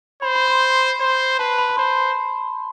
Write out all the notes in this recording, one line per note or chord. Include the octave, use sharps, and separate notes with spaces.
C5 B5
B5
C6
C6
C5
B4 A5
B5
B5
C5 C6